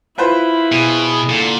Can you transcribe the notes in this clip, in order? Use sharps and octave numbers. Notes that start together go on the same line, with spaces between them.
E4 F4 B4 C5
B2 G#4
A#2 D3